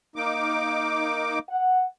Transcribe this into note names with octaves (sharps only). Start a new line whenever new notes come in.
A#3 D#4 D6
F#5